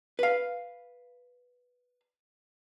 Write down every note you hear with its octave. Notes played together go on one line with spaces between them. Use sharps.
B4 F5